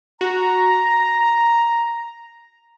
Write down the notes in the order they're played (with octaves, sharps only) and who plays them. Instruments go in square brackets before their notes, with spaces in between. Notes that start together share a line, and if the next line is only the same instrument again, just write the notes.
[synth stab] F#4 [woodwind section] A#5